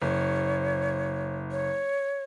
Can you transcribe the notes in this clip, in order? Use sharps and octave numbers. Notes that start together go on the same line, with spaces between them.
F#1 C#5
C#5